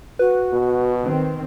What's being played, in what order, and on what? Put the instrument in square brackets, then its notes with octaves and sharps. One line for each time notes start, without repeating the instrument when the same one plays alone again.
[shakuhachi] F#4 [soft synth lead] B4
[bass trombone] B2
[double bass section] D#3 C4